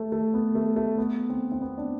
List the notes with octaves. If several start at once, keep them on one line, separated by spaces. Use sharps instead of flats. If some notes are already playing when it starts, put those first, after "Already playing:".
Already playing: A3
A3
B3
A3
A3
B3
C4
C4
B3
D4